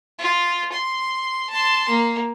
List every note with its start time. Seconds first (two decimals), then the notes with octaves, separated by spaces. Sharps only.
0.18 F4
0.72 C6
1.50 A5 C6
1.89 A#3